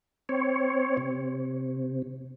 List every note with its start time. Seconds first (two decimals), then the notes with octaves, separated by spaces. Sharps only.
0.29 C4 C#5
0.97 C3